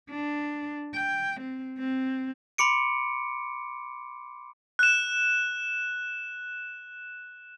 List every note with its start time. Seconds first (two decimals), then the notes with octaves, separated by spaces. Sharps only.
0.10 D4
0.94 G5
1.41 C4
1.78 C4
2.58 B5 C6 D6 C#7 D7
4.79 F#6 E7